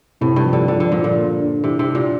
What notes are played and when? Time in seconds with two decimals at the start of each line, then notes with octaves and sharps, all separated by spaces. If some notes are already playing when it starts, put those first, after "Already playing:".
0.21 A2 C3
0.36 G2
0.45 F3
0.53 D3
0.68 D3 F3
0.80 D3
0.92 A#2 F3
1.04 A#2
1.17 A#3
1.40 D4
1.64 C3 E3
1.79 C3
1.87 D4
1.95 A#2